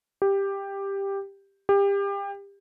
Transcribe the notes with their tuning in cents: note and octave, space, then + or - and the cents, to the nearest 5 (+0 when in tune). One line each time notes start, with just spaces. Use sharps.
G4 +10
G4 +30